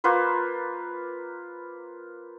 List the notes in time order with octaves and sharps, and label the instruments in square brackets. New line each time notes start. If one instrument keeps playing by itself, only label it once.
[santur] A#3 F4 B4 C5